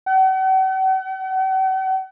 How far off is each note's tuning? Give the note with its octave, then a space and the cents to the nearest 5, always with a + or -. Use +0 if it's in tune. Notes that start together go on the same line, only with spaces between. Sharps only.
F#5 +45